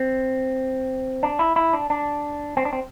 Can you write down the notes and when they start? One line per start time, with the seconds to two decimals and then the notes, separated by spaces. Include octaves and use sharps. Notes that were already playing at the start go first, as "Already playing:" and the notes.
Already playing: C4
1.23 D4
1.39 E4
1.56 E4
1.73 D4
1.90 D4
2.57 C4
2.65 D4
2.73 C4